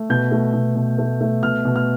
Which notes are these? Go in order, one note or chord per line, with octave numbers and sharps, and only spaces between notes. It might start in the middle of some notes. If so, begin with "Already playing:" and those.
Already playing: A3
B2 G6
A3
B2
B2
A3
A3
B2 F6
B2
F6